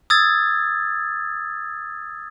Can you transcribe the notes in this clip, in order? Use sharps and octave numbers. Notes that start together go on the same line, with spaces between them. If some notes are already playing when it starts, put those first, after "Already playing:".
D#6 E6 G#6 A6